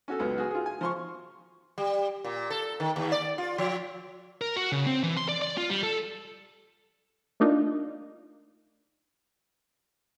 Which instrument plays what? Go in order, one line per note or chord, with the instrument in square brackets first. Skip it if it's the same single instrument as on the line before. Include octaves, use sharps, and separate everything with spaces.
[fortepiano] C#4 F#4 A4
C#2 F#3 B3
F#4 G#4
F4 G#4
G#5
F3 C6 C#6
[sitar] G3
A#2
A4
D#3
D#2
D5
F4
F3
[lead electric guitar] A#4
F#4
C#3
C4
E3
C6
D5
D5
F4
G3
A4
[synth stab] A3 A#3 D4 D#4 F4